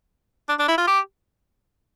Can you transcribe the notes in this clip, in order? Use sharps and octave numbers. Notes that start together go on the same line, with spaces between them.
D4
D4
E4
F4
G4